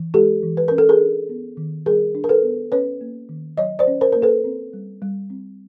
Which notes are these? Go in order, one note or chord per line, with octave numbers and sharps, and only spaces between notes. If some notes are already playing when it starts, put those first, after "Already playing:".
Already playing: E3
G#3 G4 A4
E3
B4
C#4 A#4
A4
G#4 A#4
D4
B3
D#3
G3 G#4 A#4
D4
A#4
A4 B4
B3
C#4 B4 C#5
A#3
D#3
F#3 C#5 D#5
C5 D5
C#4
A#4 C5
A#3 A#4
A4 B4
C4
G3
G3
C4